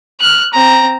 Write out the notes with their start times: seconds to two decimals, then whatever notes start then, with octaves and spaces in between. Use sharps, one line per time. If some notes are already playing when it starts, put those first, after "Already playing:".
0.20 F6 F#6
0.53 C4 A#5